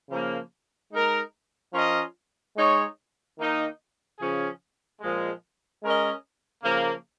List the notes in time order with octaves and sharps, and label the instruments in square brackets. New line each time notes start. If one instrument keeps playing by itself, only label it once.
[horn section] C#3 F3 A#3
G#3 D#4 A#4
F3 C#4 F4 A#4 D#5
G#3 D#4 C#5
D#3 A#3 D#4
C#3 F3 C#4 G#4
A#2 F3 G#3
G#3 C#4 A#4 D#5
C#3 F3 A#3